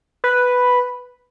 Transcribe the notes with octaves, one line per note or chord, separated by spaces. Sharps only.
B4